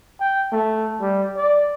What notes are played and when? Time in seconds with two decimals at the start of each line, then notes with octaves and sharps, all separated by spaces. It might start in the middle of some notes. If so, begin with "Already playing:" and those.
0.20 G5
0.52 A3
1.01 G3
1.37 D5